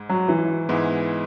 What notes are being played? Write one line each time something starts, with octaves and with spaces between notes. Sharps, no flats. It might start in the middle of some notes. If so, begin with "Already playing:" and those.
Already playing: G#2 G#3
F#3
E3
G#2 G#3 B3 E4